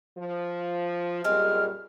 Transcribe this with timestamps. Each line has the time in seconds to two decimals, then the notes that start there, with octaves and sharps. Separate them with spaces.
0.18 F3
1.24 F#2 A#2 G3 G#3 C4 F6